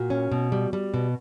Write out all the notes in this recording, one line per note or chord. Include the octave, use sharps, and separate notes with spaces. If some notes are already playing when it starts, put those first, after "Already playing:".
Already playing: A#2 F#4
C#4
B2
G3
G3
B2